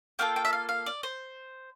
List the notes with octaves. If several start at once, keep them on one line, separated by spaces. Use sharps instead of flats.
A#3 F4 A4 G5
G5
E5
F5
F5
D5
C5